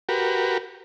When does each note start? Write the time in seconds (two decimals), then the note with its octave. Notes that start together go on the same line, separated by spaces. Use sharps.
0.09 F#4 G4 A#4 B4